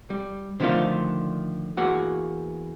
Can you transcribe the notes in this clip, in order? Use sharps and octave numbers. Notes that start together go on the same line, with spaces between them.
G3
D3 D#3 F3 A3 D4 F4
E2 A#3 F#4 F#5